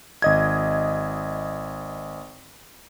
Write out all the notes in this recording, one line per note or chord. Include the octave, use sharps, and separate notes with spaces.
G#1 D#5 G#6